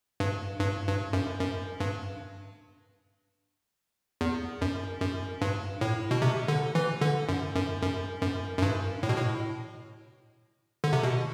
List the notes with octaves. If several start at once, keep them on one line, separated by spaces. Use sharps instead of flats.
G2
G2
G2
F#2
F#2
G2
E2
F#2
F#2
G2
A2
B2
C3
D3
E3
D3
F#2
F#2
F#2
F#2
F#2
G2
A2
B2
A2
D3
C3
B2